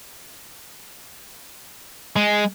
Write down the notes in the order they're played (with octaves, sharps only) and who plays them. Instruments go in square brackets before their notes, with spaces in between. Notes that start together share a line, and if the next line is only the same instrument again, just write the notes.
[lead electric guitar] G#3